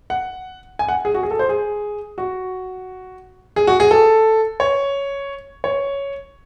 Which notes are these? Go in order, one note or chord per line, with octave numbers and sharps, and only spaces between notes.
F#5
G#5
F#5
G#4
F#4
G#4
A4
C5
G#4
F#4
G#4
F#4
G#4
A4
C#5
C#5